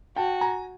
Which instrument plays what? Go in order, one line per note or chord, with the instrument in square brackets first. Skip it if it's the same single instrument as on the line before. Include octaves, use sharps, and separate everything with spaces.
[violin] F#4 [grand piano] G5 A5
[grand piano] G#5 A#5